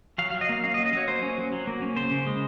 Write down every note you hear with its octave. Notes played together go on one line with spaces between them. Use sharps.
F#3 F5
F#3 F5
D#5
A#3 F5
C#4 F5
D#5
F#3
D#5
F#3 C#5
A#3 C5
C#4
F#3
F#3
A#3
C#4
C#3 C5
C#3
G#3